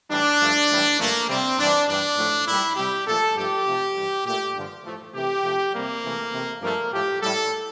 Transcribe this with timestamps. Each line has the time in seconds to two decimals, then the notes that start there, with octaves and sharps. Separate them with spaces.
0.09 A2 E3 G3 D4
0.39 G2 F3 A3
0.69 A2 E3 G3
0.98 G2 D3 F3 A3 A#3
1.28 C3 G3 C4
1.58 G2 E3 G3 D4
1.87 G2 E3 G3 D4
2.17 A2 F3 A3
2.46 A#2 G3 E4
2.76 C3 G3 G4
3.05 A#2 F3 A3 A4
3.35 G2 F3 A3 G4
3.65 C3 F3 A3
3.94 G2 E3 G3
4.24 A#2 A3 G4
4.54 G2 D3 F3
4.83 A2 F3 A3
5.13 C3 E3 A3 G4
5.43 C3 F3 A3
5.72 C3 G3 A#3
6.02 C3 E3 A3
6.32 C3 E3 A3
6.61 G2 F3 A3 A#3
6.91 A2 F3 A3 G4
7.21 A2 G3 A4